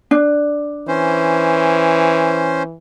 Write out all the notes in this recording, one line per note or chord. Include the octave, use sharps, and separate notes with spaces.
D4
E3 C#4 C5